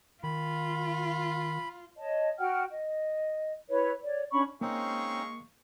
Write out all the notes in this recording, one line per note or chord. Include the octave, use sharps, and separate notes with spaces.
D#3 F4 B5
C#5 D#5 A5
F#4 F#5 G5 F6
D#5
E4 B4 C#5
C#5 D5
C#4 D4 B5 C#6
G#3 A#3 C4 C#4 D#4 F5 C#6